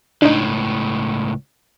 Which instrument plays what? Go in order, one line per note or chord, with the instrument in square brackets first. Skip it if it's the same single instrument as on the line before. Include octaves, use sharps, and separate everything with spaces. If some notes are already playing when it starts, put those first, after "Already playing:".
[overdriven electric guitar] C#2 A2 [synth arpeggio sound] D4 D#4